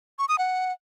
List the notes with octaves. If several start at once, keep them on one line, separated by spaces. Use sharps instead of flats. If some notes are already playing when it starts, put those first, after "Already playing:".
C#6
D#6
F#5